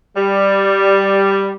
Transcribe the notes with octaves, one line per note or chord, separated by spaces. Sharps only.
G3